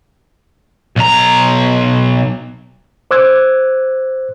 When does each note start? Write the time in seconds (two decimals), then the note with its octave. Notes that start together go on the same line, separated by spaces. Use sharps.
0.96 B1 A#5
3.11 C5 D6 E6 F#6 G#6